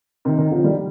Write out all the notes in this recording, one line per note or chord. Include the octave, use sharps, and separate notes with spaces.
C3 D#3
C3 D#3
D3 F3
D#3 G3